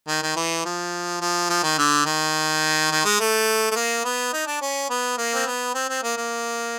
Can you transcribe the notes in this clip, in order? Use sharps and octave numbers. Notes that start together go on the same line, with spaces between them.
D#3
D#3
E3
F3
F3
F3
D#3
D3
D#3
D#3
G#3
A3
A3
A#3
B3
D#4
D4
C#4
B3
A#3
C4
B3
C4
C4
A#3
A#3